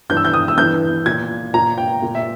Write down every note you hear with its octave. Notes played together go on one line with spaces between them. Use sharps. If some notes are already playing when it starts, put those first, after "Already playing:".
G2 E3 G6
E6
G6
D#6
E6
G2 E3 G6
A#2 G#6
A#2 A#5
G5
A#2
E5